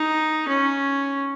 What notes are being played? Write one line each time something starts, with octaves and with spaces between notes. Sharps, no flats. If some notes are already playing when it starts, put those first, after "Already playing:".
Already playing: D#4
C#4